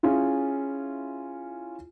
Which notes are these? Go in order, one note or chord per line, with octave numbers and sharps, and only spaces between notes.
C#4 E4 F4 G#4